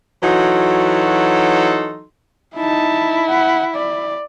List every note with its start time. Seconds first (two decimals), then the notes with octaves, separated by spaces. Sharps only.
0.23 E3 F#3 D#4 F#4 A4 C6
2.56 D#4 E4 A5
3.29 F#5
3.75 D5